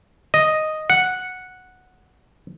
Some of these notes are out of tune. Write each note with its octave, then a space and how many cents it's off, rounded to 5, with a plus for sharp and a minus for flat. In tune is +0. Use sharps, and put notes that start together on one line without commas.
D#5 +0
F#5 -5